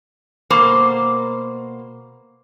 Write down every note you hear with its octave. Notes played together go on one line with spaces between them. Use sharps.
B2 A#3 C5